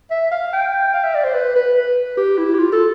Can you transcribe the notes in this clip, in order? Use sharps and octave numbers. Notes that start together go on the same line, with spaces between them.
E5
F5
G5
F5
E5
D5
C5
B4
B4
B4
G4
E4
G4
F4
A4